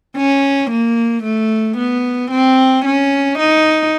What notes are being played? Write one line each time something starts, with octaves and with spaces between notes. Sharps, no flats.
C#4
A#3
A3
B3
C4
C#4
D#4